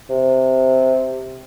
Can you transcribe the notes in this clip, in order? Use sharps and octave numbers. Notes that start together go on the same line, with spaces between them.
C3